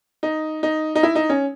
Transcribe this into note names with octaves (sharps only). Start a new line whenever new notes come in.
D#4
D#4
D#4
E4
D#4
C#4